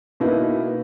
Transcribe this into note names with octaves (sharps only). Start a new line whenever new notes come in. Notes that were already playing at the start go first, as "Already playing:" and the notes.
B2 A#3 B3 D#4 E4